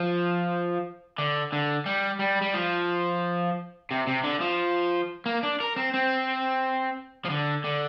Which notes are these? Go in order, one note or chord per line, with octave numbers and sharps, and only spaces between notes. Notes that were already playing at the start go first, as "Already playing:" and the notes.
Already playing: F3
D3
D3
G3
G3
G3
F3
C3
C3
D3
F3
A#3
D4
A#4
C4
C4
F3
D3
D3